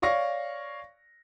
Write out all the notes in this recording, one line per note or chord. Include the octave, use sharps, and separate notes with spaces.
C#5 D5 F5 C#6 A#6